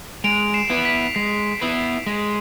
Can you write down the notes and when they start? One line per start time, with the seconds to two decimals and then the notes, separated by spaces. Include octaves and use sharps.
0.24 G#3 D7 F7
0.54 C7 E7
0.70 B3 E4 B4
0.85 B6
1.15 G#3 C7
1.61 B3 E4 B4
2.06 G#3